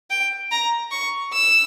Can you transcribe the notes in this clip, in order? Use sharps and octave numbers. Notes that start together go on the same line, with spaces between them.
G5
A#5
C#6
E6